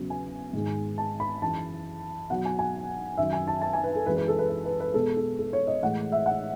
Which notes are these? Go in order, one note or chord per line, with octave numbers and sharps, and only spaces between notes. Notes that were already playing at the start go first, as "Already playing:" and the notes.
Already playing: E2 C#3 F#3
G#5
G#2 D#3 G#3
A5
B5
F#2 E3 G#3 A5
B2 F#3 F#5
G#5
G#5
F#2 D#3 F#3 E5
G#5
A5
A5
G#5
B4
A4
F#2 E3 G#3 B4
B4
A4
B4
B4
B4
B4
B2 G#3 A4
A4
A4
C#5
D#5
A2 E3 G#3 F#5
E5
F#5